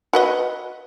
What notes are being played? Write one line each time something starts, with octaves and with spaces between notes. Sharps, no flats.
F#4 B4 D#5